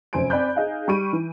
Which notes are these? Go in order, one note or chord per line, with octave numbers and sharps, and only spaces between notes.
F1 F#2 C5 G#5 D7
C4 D5 G#5 B5 F#6 G6
D#4 G#4 D#5 F5 G#5
G3 C#6 D7 D#7
E3